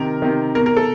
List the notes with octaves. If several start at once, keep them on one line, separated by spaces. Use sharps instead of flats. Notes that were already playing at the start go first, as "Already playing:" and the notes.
Already playing: C3 D#3 A#4
C3 D#3
B2 A#4
A#4
A4